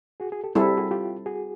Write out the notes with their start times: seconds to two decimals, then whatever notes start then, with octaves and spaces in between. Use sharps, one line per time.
0.20 F#4 G#4
0.32 F#4 G#4
0.44 G4 A4
0.55 G3 C4 E4 G#4 A4
0.66 G4
0.77 F#4 G#4
0.91 F4 G4
1.26 F#4 G#4